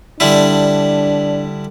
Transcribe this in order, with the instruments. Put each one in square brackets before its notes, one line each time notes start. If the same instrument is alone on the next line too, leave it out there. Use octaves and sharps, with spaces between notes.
[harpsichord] D3 G3 E4 [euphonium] D4